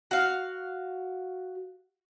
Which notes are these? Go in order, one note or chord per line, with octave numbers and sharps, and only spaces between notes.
F#4 F5